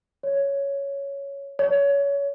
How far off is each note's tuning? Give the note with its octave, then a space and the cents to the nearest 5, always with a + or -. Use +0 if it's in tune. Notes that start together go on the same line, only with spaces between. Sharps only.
C#5 +5
C#5 +25